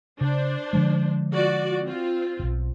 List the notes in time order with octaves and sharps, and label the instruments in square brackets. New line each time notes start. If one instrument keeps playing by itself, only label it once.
[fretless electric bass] C#3 [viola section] D4 C5
[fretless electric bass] D3 F3 G#3
[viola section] F4 F#4 D5
C4 F4
[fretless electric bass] D#1 B1